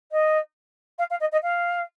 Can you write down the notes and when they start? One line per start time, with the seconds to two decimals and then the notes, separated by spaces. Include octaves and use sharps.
0.12 D#5
0.99 F5
1.10 F5
1.20 D#5
1.32 D#5
1.43 F5